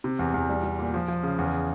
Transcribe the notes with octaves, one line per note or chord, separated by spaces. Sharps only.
C3
E2
E2
G3
G3
A#2
F3
F3
C#3
E2